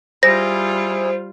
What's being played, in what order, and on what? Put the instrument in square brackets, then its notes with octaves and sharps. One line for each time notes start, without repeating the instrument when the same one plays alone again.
[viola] G3 F4 [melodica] E4 G#4 [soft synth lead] C5 [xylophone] A#6